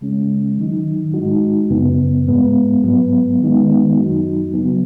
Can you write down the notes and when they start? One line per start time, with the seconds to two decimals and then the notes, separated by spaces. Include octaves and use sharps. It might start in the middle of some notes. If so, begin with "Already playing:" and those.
0.01 C#3 G#3 C#4
0.57 D#3 F#3 D#4
1.14 G#2 G#3 D#4 F#4
1.70 F#2 C#3 B3
2.27 G#2 G#3 B3
2.83 G#2 F#3 B3
3.41 D#3 G#3 B3 D#4
3.97 F#2 F#3 D#4 F#4
4.54 C#3 F#3 B3